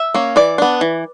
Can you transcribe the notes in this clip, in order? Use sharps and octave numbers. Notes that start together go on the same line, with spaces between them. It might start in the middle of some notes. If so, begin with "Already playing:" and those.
Already playing: E5
A#3 C#4
E3 D5
B3 D4
E3